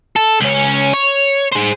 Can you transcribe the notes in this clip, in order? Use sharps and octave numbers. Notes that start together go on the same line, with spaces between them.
A4
C#2 C#4
C#5
G#4 C5